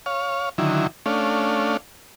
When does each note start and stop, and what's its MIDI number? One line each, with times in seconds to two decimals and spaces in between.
0.06 0.49 73
0.06 0.49 77
0.58 0.87 50
0.58 0.87 51
0.58 0.87 54
0.58 0.87 64
1.06 1.77 57
1.06 1.77 61
1.06 1.77 62
1.06 1.77 77